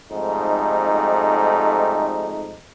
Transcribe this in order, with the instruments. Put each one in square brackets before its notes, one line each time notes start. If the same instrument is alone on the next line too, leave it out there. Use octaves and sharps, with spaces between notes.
[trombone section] F2 G#2 G3 A3 D#4